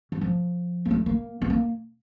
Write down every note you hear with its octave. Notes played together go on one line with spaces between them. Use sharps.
E3
F3
A#3
A3
A#3
B3
A#3